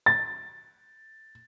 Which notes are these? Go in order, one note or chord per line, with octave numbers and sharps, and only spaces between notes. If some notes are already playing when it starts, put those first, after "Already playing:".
A6